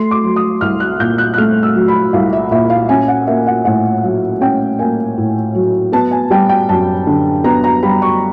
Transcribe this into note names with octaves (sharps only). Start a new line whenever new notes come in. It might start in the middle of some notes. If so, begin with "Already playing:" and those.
Already playing: A3 C6
D6
F#3
D#6
C2 F6
F#6
A#2 G6
F#6
F#6
A3 F6
E6
F#3
B5
C2 F5
E5
A#2 E5
F5
C#4 G#5
F#5
A#3 E5
F#5
A2 F#5
F#3 F#5
C#4 G5
A#3 G#5
A2
F#3
B3 A5
G#5
G3 G5
G5
F#2 A5
D3
B3 A#5
A#5
G3 B5
C#6